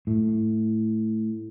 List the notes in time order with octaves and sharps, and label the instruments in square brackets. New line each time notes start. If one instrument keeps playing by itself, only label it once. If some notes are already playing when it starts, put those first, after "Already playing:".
[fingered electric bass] A2